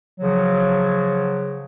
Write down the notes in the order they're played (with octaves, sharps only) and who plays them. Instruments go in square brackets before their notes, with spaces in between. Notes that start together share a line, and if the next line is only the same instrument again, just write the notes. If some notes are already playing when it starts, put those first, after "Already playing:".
[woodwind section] C#3 F3 F#3